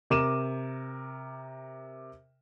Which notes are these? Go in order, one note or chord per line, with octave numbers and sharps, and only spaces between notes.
C3 A#4 D6 D#7 E7